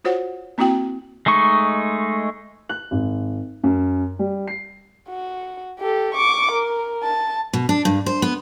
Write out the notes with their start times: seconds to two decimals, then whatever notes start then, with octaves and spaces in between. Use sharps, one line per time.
0.04 F4 F#4 C5 C#5 F#5
0.58 A#3 C4 E4 F#4 G5
1.26 G#3 A3 D#4 C#6
2.69 F#6
2.91 G#1
3.63 F#2
4.19 G3
4.48 C7
5.09 F#4
5.80 G4 A4
6.15 C#6 D6
6.52 A#4
7.03 A5
7.53 B2
7.69 D4
7.85 G2
8.06 C5
8.22 B3